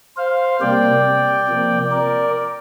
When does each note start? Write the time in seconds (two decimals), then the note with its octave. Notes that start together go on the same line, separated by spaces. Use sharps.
0.17 C5 F5
0.60 C3 G3 A#3 D5 G5
1.48 C3 F3 A#3
1.91 A#4 D5